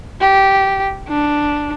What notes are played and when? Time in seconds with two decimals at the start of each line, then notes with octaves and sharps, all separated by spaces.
0.21 G4
1.09 D4